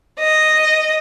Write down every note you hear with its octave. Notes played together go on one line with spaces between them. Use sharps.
D#5